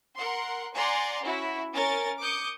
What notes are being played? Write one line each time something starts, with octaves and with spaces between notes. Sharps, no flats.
A#4 F#5 C6
D5 F#5 G#5 A#5 C6
C#4 E4 F#4
C#4 A#4 A6
D6 D#6 G6 C#7